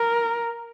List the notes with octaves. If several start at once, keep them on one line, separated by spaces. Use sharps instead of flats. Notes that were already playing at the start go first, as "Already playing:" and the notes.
Already playing: A#4